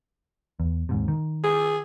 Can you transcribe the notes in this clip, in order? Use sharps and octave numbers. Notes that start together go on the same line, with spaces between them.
E2
D#2 G#2 C3
D#3
G#4